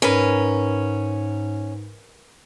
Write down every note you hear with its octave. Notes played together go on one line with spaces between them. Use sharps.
G#2 C#4 A#4 B4